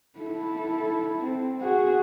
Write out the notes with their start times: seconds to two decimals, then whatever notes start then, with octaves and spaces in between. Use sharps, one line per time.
0.19 E4 A4
1.24 C4
1.62 F#4 G#4